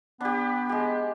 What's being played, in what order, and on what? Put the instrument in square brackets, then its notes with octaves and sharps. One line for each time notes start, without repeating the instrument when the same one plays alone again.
[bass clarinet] B3 [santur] D4 G4
[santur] G#3 G4